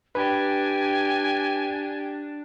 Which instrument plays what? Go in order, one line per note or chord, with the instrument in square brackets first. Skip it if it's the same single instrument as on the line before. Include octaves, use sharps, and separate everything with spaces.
[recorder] D4 [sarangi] G4 [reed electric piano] B4 [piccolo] G#5